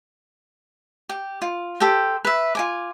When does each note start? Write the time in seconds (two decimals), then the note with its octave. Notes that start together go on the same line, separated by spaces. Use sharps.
1.09 G4
1.42 F4
1.80 G4 A4 C5 G5
2.25 B4 E5
2.55 F4 G#5 D6